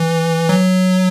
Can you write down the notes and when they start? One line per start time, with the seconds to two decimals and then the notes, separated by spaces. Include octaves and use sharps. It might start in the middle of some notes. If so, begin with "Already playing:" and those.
Already playing: E3
0.49 F#3